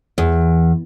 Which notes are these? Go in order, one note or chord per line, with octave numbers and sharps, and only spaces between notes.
E2